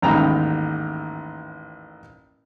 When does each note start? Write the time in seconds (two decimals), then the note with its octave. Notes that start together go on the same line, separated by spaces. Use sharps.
0.02 A1 D#2 G#2 G5 A#5 B5